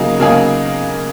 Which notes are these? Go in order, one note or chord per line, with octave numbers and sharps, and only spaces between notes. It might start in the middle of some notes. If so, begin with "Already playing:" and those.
Already playing: C#3 F#3 A#3 D#4 G#4
C#3 F#3 A#3 D#4 G#4